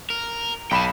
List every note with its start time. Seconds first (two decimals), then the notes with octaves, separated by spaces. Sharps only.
0.10 A#4
0.71 B1 G5 A5 B5 E7